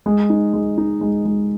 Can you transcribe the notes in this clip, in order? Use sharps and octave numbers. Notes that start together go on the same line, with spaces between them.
G#3
D#4
G#3
D#4
G#3
G#3